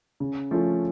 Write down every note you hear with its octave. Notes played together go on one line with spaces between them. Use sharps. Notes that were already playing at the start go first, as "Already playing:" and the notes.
C#3
F3 A3 C#4 F4